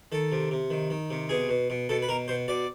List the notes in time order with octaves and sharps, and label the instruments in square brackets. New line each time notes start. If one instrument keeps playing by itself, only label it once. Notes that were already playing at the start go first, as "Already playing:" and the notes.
[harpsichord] D#3 A4
C3
C3
D#3
D#3
C3
B2 G#4
B2
B2
B2 A4
B4
B2 A#4
B2 C5
B2 D5